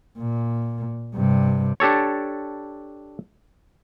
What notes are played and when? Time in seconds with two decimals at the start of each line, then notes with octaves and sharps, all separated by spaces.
0.19 A#2
1.16 G2 C3
1.80 D4 G4 A4 C#5